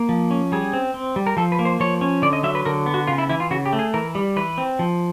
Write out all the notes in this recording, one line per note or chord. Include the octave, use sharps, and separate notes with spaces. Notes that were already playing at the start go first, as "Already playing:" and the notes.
Already playing: A#3
F3
C#4
G3 G#4
C4
C4
G3
A#4
F3 A4
B4
A#3
C5
F3 C#5
C#4
D3 D5
D#5
F#3 E5
B4
D3 A#4
B3
F#4
C#3 F4
E4
E3 E4
F4
C#3 F#4
G4
A3
G#4
E3 A#4
G3
E3 B4
C4
F3